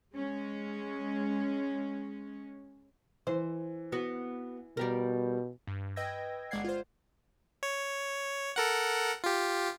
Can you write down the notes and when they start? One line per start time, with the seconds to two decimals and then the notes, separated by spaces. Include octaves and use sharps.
0.14 G#3 C#4
3.27 E3 C5
3.92 B3 F#4
4.77 B2 G3 G4 A#4
5.67 G2
5.96 B4 D#5 G5 E6 G#6 A#6
6.51 G1 G#3 D5 F#5 G#6 C7
6.64 F4 C5
7.63 C#5
8.56 A4 A#4 F#5
9.24 F4 G4